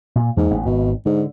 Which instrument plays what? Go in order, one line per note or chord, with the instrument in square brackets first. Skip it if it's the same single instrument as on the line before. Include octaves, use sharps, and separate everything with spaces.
[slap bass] A#2
[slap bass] E2 E3 A#3 [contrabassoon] G#2
[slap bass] A1 B3
[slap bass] G#1 [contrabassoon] B2
[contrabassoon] G#2 [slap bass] D3